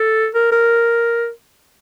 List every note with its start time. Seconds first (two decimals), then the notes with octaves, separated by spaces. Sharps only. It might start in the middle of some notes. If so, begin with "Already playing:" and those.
Already playing: A4
0.35 A#4
0.52 A#4